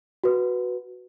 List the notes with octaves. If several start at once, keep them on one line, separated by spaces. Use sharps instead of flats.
F#4 B4